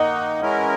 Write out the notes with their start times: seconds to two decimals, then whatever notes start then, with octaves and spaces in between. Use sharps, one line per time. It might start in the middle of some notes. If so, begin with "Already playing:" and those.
Already playing: D#3 A#3 D#4 D#5 F#5
0.41 E3 G#3 C#4 E4 A#4